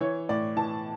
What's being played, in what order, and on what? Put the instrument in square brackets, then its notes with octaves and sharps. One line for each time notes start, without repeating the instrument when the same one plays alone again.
[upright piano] E3 C#5
A2 D5
E3 A5